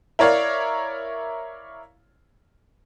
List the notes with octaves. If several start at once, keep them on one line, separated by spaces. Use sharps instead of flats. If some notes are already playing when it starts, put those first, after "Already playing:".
E4 A#4 C#5 D5 F5